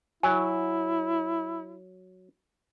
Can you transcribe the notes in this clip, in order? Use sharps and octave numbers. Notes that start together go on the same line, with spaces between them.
F#3 E4 G#5